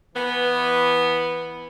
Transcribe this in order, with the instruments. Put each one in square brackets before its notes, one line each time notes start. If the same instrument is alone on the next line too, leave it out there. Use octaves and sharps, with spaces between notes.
[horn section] E3 B3